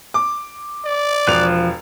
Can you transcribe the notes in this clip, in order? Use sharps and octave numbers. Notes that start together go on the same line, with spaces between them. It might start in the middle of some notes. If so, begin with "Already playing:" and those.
D6
D5
E1 F3 F#6 F7